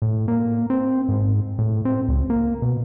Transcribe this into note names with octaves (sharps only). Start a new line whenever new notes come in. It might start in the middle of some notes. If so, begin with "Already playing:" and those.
A2
A#3
C4
G#2
A2
C4
C#2
A#3
B2